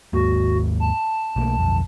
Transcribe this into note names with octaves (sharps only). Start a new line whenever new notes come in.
D#2 G#2 A#3 F#4
A5
B1 A3 A#3
B1 F2